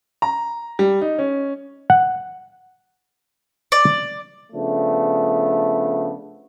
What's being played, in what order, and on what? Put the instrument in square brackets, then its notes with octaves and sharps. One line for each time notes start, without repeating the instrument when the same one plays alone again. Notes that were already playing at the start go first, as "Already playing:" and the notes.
[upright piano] A#5
G3
D#4
C#4
[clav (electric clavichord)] F#5
[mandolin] D5
[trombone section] C#3 F3 A3 B3 D4